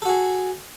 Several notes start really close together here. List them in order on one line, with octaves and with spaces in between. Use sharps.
A4 F#4 G#4